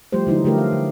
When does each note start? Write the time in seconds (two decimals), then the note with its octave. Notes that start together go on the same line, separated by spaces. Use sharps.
0.12 F3 G3 A3 G4 C5
0.27 D3 E3 F#3 D#4
0.44 D3 F3 A3 G4 A#4
0.58 F5
0.73 D3